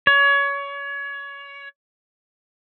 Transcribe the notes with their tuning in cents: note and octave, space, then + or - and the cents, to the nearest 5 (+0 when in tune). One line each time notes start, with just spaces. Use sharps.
C#5 +25